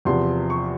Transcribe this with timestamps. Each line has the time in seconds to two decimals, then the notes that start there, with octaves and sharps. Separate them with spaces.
0.05 E2 C3 F3 C6
0.50 C#6